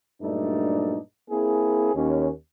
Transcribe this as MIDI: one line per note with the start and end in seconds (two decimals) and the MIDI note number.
0.22 0.97 43
0.22 0.97 46
0.22 0.97 54
0.22 0.97 57
0.22 0.97 62
0.22 0.97 63
1.30 1.92 58
1.30 1.92 60
1.30 1.92 64
1.30 1.92 68
1.95 2.30 39
1.95 2.30 61